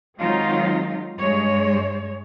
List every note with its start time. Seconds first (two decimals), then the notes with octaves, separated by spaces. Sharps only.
0.20 D#3 F#3 G#3 C4 D#4 F4
1.19 G2 G#3 C#5